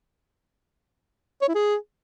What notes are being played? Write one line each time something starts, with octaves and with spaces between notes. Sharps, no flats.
C#5
E4
G#4